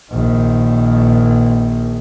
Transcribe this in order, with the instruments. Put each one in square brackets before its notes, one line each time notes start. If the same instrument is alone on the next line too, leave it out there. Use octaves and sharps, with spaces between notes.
[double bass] A#1 D#3